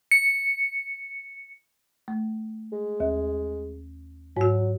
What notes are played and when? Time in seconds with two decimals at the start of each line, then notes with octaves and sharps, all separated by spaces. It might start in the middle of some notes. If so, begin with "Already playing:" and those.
0.11 C#7
2.08 A3
2.72 G#3
3.00 D#2
4.37 G#2 F#3 F#4